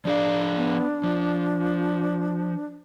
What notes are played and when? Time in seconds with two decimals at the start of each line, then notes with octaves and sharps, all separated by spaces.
0.05 F3 D4 G#4 D5 F5
0.57 B3
1.04 F3 F4